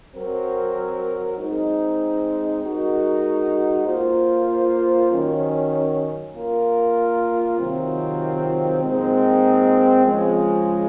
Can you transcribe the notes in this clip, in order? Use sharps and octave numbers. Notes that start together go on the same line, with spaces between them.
F#3 C4 F#4 A#4
G#3 C4 D#4
G#3 D#4 F#4 A#4
A#3 F4 C5
D#3 F#3 C#4
A#3 F4 A#4
C3 D#3 F#3 C4 F4
A#2 G#3 C4 D#4
C#3 F3 G#3